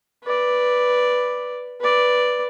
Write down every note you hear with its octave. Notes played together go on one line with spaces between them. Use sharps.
B4 D5
B4 D5